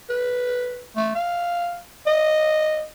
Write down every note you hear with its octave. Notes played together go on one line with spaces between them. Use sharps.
B4
A3
F5
D#5